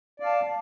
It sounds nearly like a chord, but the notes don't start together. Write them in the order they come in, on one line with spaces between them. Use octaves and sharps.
D5 F5 A5